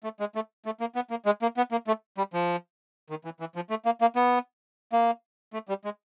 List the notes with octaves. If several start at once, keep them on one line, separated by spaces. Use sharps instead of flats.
A3
G#3
A3
A3
A#3
B3
A#3
G#3
A#3
B3
A#3
A3
G3
F3
D#3
E3
E3
F3
A3
A#3
A#3
B3
A#3
A3
G3
G#3